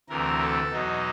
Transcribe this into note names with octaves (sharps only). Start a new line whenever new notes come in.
D2 C3 E3 A#4
A4
E2 B2 F#3 D#4